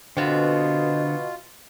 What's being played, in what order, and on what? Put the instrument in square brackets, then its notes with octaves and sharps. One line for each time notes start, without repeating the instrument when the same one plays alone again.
[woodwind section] B2 [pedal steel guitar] D3 [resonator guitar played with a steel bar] B3 C4 [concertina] F4